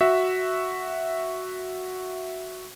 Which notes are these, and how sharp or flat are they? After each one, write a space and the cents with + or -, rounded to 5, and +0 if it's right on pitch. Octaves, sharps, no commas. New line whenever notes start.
F#4 +0 E5 +0